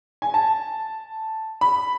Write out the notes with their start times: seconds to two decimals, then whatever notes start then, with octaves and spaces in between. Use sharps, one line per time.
0.22 G#5
0.34 A5
1.61 B5